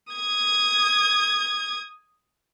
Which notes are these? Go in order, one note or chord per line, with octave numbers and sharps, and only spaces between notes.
D#6 G#6